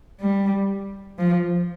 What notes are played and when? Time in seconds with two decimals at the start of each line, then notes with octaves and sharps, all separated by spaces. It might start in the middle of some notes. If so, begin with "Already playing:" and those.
0.21 G3
1.18 F3